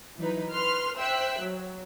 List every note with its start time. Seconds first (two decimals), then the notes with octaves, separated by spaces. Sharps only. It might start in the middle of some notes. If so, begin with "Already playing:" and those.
0.18 E3 F#3 D#4 B4
0.52 B4 C6 F6
0.97 C5 E5 G5 E6 F#6
1.41 F#3